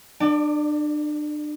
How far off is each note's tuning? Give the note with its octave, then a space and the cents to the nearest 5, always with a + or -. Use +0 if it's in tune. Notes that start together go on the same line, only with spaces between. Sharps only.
D4 +35 D5 +0